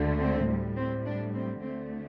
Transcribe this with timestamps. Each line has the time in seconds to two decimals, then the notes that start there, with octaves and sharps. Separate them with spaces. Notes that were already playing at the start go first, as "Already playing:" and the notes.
Already playing: D2 D3 A3
0.19 C4
0.47 A2 G3
0.76 C4
1.05 D4
1.33 C4
1.61 D2 D3 A3 C4